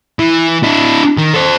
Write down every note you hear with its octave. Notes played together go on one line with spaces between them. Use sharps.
E3
D4 E4
D#3
A4 C5